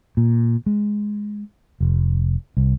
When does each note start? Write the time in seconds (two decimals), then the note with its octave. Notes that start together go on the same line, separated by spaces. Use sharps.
0.17 A#2
0.66 G#3
1.81 F1
2.57 C2